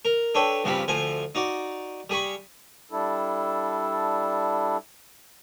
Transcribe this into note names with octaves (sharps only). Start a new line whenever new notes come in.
A#4
D4 A4 B4 C#5 G5
G2 C#3 F3 C4 G4 B5
D2 F3 C5 G#5
D#4 F#4 D5
G3 G#4 B5 C#6
G3 D4 E4 A4